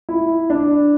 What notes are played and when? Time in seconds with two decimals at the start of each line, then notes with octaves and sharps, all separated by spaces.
0.09 E4
0.50 D4